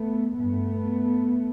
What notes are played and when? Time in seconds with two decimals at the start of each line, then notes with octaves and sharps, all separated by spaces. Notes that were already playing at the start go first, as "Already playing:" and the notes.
Already playing: A3 B3
0.39 G2 A3 B3